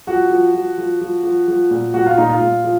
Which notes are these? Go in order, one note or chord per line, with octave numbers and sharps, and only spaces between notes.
F3 F#4
F3
F3
F3
F3
F3
F3
A#2
A#2 F#4
F4
A#2 D#4
F4
A#2
F3